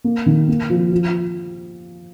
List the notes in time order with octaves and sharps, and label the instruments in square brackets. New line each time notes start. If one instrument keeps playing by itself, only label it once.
[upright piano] A#3
D#3
A#3
F3
F3